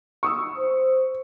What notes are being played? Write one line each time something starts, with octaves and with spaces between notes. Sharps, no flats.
C#6 D#6 E6
C5